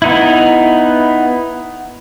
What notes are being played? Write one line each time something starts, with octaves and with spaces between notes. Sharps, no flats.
B3 D#4 E4